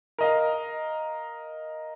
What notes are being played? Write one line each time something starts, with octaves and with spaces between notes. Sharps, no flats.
A#4 D#5 F5